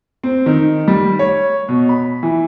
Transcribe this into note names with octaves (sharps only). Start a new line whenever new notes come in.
C4
D#3
G3
C#5
B2
B5
E3